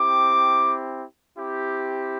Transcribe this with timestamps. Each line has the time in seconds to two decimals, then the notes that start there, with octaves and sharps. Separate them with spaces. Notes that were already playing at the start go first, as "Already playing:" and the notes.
Already playing: C4 E4 G4 D6
1.37 C4 E4 G4